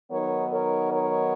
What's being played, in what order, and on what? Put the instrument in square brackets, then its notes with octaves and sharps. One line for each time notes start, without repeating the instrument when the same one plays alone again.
[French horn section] D#3 F#3 B3 D#4 A#4 C#5
A#4 C#5
A#4 C#5